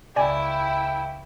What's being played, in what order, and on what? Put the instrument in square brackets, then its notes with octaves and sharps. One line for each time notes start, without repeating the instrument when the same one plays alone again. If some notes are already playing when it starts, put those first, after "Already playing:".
[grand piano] C#2 [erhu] E4 [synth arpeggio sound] D5 G#5 [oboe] G5